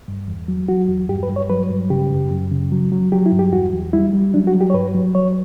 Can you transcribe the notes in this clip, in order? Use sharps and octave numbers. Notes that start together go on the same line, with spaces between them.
G2
E2
F#3
F#3 F#4
E2
G2 G4
B4
G2
C#5
F#3 B4
G2
C#3 G4
F#2
F#2
C#3
F#3
F#3
F#3 G4
E4
G2
G4
E2 F#4
E2
G3 E4
G3
F#3 D4
F#4
F#3
G4
C#5
G2 B4
F#3
F#3 C#5